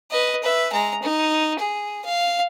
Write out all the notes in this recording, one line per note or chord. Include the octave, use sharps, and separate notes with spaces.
B4 D#5
B4 E5
G#3 A#5
D#4
G#4
F5